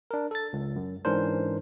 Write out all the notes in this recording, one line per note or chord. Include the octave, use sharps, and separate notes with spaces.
D4 A#4
A4 A6
C#2
F#2
G#2 E3 C#4 D4 A#4 C5